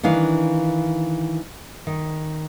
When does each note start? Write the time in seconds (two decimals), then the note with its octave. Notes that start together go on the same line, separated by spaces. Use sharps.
0.03 D#3 E3 D4 F5
1.87 D#3